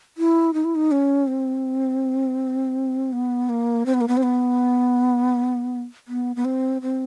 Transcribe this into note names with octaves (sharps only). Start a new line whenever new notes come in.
E4
D#4
E4
D#4
C#4
C4
B3
A#3
C4
B3
A#3
B3
C4
B3
B3
B3
C4
C4